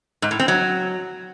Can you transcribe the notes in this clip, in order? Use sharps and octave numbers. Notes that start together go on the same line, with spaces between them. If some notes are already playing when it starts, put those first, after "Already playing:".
G#2
A2
C4
F#3